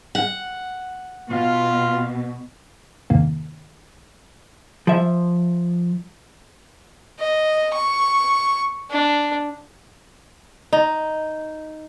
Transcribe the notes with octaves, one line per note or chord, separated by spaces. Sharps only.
F#5
B2 F4
E2 G2 C3 D#3 A#3
F3 E5
D#5
C#6
D4
D#4